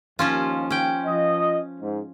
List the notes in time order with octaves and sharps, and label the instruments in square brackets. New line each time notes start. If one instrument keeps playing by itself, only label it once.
[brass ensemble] D#2 [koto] F3 C#4 F4
[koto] C#4 G5
[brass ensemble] F3 D#5
G#2